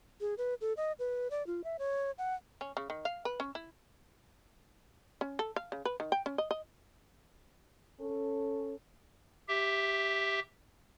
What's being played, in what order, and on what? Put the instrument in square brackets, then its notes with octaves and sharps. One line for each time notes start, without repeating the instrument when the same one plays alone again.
[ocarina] G#4
B4
A4
D#5
B4
D5
F4
E5
C#5
F#5
[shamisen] C#4
C#3
D#3
F5
B4
C#4
E4
C#4
A4
F5
C#3
B4
D#3
G5
C#4
D#5
D#5
[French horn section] C#4 A4
[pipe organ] G4 E5